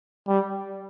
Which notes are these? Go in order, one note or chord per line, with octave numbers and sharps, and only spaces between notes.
G3